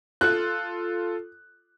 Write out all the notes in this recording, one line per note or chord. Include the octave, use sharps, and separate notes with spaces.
F4 A4 F#6